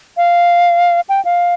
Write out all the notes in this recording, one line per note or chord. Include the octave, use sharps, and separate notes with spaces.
F5
G5
F5